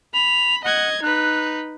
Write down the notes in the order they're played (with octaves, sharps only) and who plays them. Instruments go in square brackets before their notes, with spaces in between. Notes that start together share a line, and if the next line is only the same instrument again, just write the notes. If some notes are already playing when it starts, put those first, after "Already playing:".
[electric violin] B5 [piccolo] F7
[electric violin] D#5 G#6 [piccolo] F#5
[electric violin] D#4 B4 [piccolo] F#6